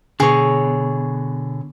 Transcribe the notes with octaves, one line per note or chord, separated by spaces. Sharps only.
B2 D3 G#4 C#5